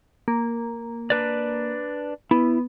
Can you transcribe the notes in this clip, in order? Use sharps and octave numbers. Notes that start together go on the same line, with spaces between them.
A#3
D4 B4 D5
B3 E4